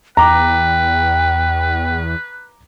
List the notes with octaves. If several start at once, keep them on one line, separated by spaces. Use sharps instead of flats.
E2 B4 G5 A#5 D6